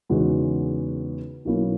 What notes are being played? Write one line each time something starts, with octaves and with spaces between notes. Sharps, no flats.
E2 C#3 G#3 D#4 F#4
B1 B2 A#3 C#4 E4